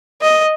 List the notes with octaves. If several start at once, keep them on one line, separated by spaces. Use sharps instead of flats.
D#5